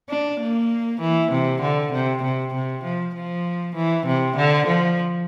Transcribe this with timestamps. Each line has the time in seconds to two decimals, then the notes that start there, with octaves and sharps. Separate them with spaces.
0.09 D4
0.40 A#3
1.01 E3
1.32 C3
1.62 D3
1.93 C3
2.23 C3
2.54 C3
2.84 F3
3.15 F3
3.76 E3
4.07 C3
4.37 D3
4.67 F3